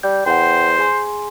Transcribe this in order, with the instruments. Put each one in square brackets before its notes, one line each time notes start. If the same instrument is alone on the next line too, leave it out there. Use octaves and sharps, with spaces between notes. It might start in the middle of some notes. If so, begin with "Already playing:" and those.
[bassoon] G3 [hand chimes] G6
[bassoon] E2 [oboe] C5 [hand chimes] F#5 G5
[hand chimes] G#4 G#5 C6